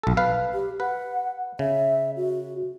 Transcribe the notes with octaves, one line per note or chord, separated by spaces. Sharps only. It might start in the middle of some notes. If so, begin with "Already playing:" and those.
B1 A4
B4 F5
G4
B4 F#5
C#3 E5
F#4